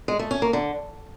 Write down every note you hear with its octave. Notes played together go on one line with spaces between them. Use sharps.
G#3
A3
C#4
A#3
D3